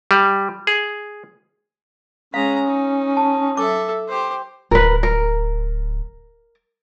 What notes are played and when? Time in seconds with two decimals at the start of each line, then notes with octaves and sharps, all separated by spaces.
0.11 G3
0.67 G#4
2.34 G#3 C#4 F5 A#5
2.67 D#4
3.17 A5
3.57 A4 E5 D6
4.09 G4 C5
4.71 D1 A#4 B4
5.03 A#4